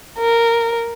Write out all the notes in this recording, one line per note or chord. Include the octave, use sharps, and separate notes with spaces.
A#4